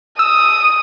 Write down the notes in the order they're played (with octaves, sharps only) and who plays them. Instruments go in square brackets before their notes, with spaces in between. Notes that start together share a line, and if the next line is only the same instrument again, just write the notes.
[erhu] D#6 [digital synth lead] E6